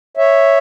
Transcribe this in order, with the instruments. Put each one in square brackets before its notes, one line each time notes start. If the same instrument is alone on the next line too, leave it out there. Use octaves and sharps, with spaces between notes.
[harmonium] C#5 E5